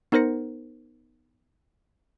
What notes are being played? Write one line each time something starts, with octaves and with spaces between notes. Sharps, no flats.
B3 D#4 A#4 C5 A#6 C#7